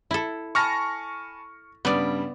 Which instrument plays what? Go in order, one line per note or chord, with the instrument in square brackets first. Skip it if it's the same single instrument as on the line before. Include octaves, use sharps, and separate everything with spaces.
[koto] E4 A4
[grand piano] G#5 A5 B5 [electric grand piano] C#6 F6 A#6
[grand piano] G2 C#3 G3 [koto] B3 D5